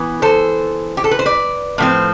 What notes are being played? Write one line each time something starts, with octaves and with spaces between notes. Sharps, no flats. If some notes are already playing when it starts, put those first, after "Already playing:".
Already playing: E3 B3
A4 C5
G4
A4
B4
C5
B4 D5
A2 F3 C4